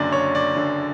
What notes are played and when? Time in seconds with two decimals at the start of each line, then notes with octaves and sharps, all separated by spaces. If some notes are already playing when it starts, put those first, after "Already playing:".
Already playing: F#1 F#2 D3 D5
0.12 C#5
0.35 D5
0.56 F#1 F#2 D3